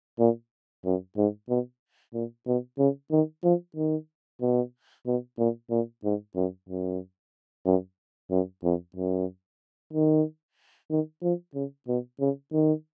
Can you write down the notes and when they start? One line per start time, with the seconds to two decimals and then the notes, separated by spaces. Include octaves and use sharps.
0.19 A#2
0.85 F#2
1.17 G#2
1.49 B2
2.14 A#2
2.47 B2
2.78 C#3
3.11 D#3
3.44 F3
3.76 D#3
4.41 B2
5.06 B2
5.39 A#2
5.70 A#2
6.04 G#2
6.36 F#2
6.69 F#2
7.66 F#2
8.31 F#2
8.64 F2
8.96 F#2
9.93 D#3
10.90 D#3
11.23 F3
11.54 C#3
11.88 B2
12.20 C#3
12.53 D#3